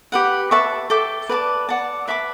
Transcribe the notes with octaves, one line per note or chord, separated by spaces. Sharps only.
G4 B4 F#5
B4 E5 A5 C#6
A4 E5 G5 D6
B4 D5 A5 D6
D5 F#5 A5
B4 E5 A5 D6